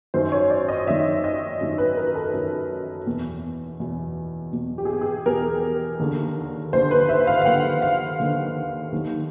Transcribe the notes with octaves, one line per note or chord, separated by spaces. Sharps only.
F#2 D#3 C5
C#5
D5
D#5
F#2 D#3 E5
D#5
F#2 D#3
B4
A#4
A4
F#2 D#3
E2 B2
E2 B2
E2 B2
G4
G#4
G4
G#4
E2 B2 A#4
D#2 D3
D#2 D3 C5
B4
E5
F5
F5
D#2 D3 F#5
F5
D#2 D3
D#2 D#3